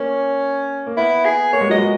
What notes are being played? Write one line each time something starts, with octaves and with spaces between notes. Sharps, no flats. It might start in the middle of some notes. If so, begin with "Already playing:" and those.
Already playing: A#3 C#4
A#3
B3 E4
G#4
A#3 C#5
G#3
F#3 D#5
G#3